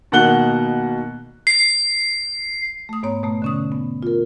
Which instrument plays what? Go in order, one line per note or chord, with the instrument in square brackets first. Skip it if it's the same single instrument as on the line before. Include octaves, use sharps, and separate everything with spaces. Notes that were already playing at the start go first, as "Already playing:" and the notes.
[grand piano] B2 D#3 A#3 F#5 F#6 G7
[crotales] C7
[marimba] A3 D#6
G#2 B3 C#5 A#5
B2 A3
D3 C#4 D#6
B3
F4 A#4